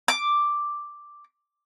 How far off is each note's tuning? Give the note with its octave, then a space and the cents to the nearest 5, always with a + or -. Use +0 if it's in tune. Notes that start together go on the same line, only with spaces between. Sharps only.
D6 +0